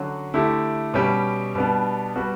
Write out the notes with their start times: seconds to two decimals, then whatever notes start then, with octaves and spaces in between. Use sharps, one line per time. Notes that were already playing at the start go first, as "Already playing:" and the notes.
Already playing: D3 F#3 C#4 F#4
0.34 D3 A3 E4 G4
0.94 B2 G3 C#4 G4
1.55 B2 G3 B3 D4
2.16 G3 B3 F#4